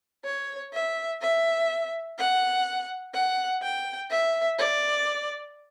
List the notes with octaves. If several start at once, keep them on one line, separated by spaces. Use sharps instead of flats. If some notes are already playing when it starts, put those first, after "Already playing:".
C#5
E5
E5
F#5
F#5
G5
E5
D5